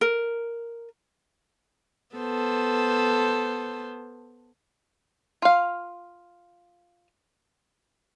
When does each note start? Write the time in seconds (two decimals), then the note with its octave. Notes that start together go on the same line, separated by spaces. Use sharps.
0.01 A#4
2.16 B3 A4 C5
5.42 F4 F5